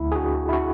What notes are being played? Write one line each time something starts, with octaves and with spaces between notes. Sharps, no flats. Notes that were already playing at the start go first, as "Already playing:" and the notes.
Already playing: D2 E4
G#4
D4 F#4
E4
D4 F#4